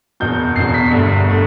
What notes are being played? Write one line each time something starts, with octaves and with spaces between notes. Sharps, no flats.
F#1 E2 B2 G6
F#1 E2 B2 C7
B6
G1 G2 D3 A3
D3 A3